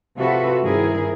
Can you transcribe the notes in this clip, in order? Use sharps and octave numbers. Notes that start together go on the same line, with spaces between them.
C3 F4 F#4 A4 B4 E5
G2 D#3 C4 E4 G#4 A#4